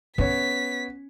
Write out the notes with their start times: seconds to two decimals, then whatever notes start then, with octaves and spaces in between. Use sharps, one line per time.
0.18 B3 C#4 C#5 B6